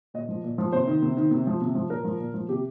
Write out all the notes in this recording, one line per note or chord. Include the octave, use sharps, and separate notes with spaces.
A#2 D#5
F3
A#2
F3
C3 C5
D#3
C3
D#3
C3
F3
C3
F3
A#2 A#4
F3
A#2
F3
C3 G4